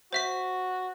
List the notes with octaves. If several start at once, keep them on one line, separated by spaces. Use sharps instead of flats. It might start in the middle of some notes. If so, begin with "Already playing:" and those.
F#4 C5 E5 B6